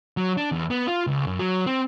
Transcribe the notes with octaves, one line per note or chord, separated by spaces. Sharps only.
F#3
D4
E2
B3
F4
C#2
F#2
F#3
C4